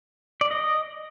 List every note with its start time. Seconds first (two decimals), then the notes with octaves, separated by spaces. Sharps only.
0.41 D5
0.51 D#5